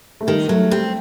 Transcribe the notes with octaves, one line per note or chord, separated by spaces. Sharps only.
A3
D#3 G3
F#3 A3
G3 C4